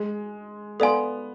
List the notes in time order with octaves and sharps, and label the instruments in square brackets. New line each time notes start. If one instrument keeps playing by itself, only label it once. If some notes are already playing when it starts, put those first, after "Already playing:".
Already playing: [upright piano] G#3
[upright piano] B3 [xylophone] A4 D5 F5 G#5 C6